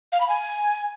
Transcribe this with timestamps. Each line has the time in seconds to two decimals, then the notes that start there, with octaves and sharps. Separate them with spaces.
0.12 F5
0.20 B5
0.28 G#5